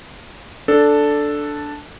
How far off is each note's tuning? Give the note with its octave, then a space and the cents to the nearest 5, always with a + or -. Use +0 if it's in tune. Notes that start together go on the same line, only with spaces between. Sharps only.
D4 +0 A4 +0